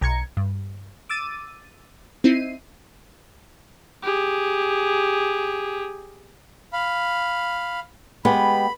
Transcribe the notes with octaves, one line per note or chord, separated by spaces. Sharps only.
B1 A#5 G#6 C#7
G2
D6 E6 A6 D#7
C4 D#4 E4 C7 D#7
G4 G#4
F5 B5
G#3 B3 G4 B5